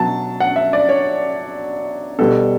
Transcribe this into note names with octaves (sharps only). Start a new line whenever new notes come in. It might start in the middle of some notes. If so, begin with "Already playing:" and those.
Already playing: B2 F#3 A5
F#5
E5
D5
C#5
B2 G3 A4